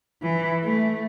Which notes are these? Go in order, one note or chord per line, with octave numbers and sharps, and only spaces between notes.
E3
A3